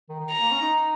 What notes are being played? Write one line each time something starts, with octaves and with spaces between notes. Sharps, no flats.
D#3
D#3
A#5
A#3
C#4
D#4